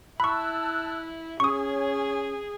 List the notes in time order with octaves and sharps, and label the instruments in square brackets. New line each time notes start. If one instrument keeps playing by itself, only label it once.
[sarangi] E4 [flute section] A5 E6 F#6 [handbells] B5 C#6
[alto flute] C#4 [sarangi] G#4 [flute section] C#5 [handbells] C#6 D#6